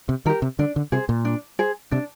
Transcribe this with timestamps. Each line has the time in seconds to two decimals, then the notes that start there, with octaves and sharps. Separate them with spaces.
0.09 C3
0.26 D#3 G4 A#4
0.42 C3
0.59 D3 D4
0.76 D3
0.92 C3 G#4 C5
1.09 A#2
1.25 D4
1.59 G#4 C5
1.91 C3 D4